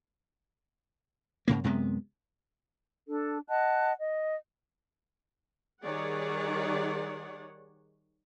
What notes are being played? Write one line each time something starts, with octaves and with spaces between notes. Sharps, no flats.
G#2 C#3 A#3
F#2 C3 G#3 B3
D4 A4
D#5 F#5 A5 F#6
D#5
D#3 G3 G#4 C#5 D5 F#5